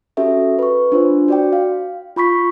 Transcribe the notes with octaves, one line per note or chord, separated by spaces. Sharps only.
C#4 F#4 G4 A4 E5
B4 C#6
D4 F4 C5
F#4 D5 G5
F5
F4 B5 C#6 B6